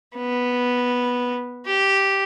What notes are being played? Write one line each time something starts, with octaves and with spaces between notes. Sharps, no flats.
B3
G4